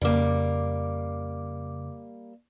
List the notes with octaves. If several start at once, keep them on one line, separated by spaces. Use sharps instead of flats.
F2 C#3 G3 A#3 D6